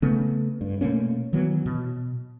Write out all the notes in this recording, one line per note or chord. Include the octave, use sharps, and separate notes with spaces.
C#3 A3 B3
G2
B2 A3 A#3 C#4
D#3 E3 F#3 B3
B2